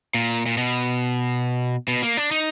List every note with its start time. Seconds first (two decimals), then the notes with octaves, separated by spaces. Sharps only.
0.14 A#2
0.46 A#2
0.57 B2
1.88 B2
2.03 A#3
2.17 D4
2.31 D#4